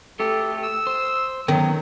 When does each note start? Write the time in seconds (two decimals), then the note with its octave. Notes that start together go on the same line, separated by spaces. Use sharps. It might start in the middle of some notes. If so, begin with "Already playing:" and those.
0.20 A3 G4 A4
0.63 E6
0.87 C5
1.48 D#3 F#3 B3 C#4